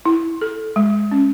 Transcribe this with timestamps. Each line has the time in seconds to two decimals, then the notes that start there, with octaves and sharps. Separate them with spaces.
0.05 E4
0.41 A4
0.76 G#3
1.12 C#4